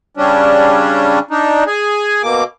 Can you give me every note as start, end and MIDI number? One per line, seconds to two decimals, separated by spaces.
0.17 1.19 49
0.17 1.19 55
0.17 1.19 61
0.17 1.19 62
1.31 1.64 62
1.31 1.64 63
1.67 2.22 68
1.67 2.22 80
2.23 2.44 47
2.23 2.44 58
2.23 2.44 86